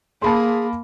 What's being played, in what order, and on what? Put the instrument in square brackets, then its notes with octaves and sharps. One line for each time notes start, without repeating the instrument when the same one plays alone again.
[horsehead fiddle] A#3 [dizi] G#4 [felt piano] A5 B5 C6